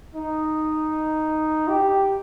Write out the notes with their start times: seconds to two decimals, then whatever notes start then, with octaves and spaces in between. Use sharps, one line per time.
0.15 D#4
1.68 G4